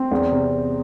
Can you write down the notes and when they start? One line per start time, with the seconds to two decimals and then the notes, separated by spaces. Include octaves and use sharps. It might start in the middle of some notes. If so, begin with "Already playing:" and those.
Already playing: C4
0.11 E2
0.32 C3